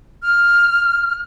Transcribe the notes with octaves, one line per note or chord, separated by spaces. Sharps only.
F6